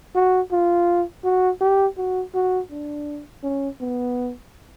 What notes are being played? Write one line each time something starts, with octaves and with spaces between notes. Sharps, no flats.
F#4
F4
F#4
G4
F#4
F#4
D4
C#4
B3